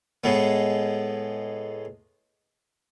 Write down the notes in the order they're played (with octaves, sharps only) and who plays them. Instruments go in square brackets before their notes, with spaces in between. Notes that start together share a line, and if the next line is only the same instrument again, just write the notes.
[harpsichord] A2 G#3 B3